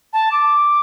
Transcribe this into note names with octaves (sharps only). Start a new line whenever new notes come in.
A5
D6